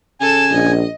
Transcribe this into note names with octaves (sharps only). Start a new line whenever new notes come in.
C#3 A4 G#5 E7
A#1 D#5